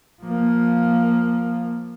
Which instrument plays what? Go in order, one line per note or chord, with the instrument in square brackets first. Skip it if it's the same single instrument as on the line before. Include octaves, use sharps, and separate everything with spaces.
[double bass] F3 A#3